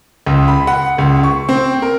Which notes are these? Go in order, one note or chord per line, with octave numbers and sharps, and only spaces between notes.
C#2
B5
F#5
C#2
C#6
C4
A#4